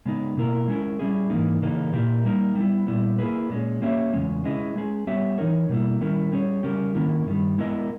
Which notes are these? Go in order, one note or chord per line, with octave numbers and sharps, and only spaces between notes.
C#3 G#3 B3 D#4
B2 A#3 E4 A#4
G#3 C#4 E4 A#4
G3 A#3 C#4 E4 G#4
G#2 E3 A#3 D#4
C#3 E3 A#3 D#4 G#4
A#2 A#3 E4 G4 A#4
G3 A#3 D#4 A#4
G3 B3 E4
A#2 G3 B3 E4
A#3 E4 G#4 B4
A#2 G#3 C#4
A#3 C#4 G4 C#5 E5
E2 C#3 G#3 C#4
G#3 C#4 E4 G#4 D#5
G#3 C#4 G#4
G3 B3 G4 C#5 E5
E3 G#3 D#4 A#4 C#5
B2 G3 A#3 E4
D#3 G3 C#4 E4 A#4
G3 C#4 G#4 C#5
C#3 G3 C#4 G4 A#4
D#3 A#3 C#4 E4 A#4
G2 D#3 G3
G#3 B3 E4 A#4 D#5